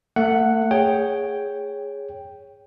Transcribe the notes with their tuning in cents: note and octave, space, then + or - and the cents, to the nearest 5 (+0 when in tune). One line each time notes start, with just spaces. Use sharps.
A3 +40 F#5 +0
G#4 -10 C#5 +0 G5 +0